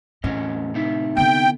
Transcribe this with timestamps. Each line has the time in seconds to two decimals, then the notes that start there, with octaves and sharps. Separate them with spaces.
0.24 E2 A2 C#4 D#5
0.74 C3 D#4 E4
1.17 D3 B3 G5